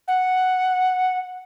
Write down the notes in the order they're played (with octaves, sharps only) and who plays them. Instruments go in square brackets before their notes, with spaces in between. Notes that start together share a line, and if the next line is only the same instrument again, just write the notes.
[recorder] F#5